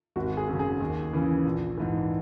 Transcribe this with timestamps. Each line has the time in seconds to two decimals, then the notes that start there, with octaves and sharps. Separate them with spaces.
0.16 G#1 F#4
0.37 G#4
0.48 F#2 C#3
0.59 G#4
0.80 D#2
1.13 C#3 E3
1.45 A#1
1.77 G#2 E3